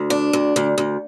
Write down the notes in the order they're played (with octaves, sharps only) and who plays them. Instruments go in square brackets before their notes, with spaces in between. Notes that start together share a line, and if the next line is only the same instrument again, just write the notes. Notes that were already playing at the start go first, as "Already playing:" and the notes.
Already playing: [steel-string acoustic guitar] D2
D4
D2
D2
D2